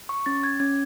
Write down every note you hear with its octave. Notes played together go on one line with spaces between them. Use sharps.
C#6
C#4 A6
G#6
C#4 G#6